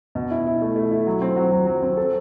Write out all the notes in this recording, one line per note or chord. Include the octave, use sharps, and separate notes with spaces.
B2
E4
E4
A3
A3
E4
F#3
C4
F#3
F#3
F#3
C4
A4